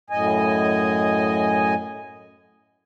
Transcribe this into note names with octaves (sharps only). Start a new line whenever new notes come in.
F#2 A2 D#5 G#5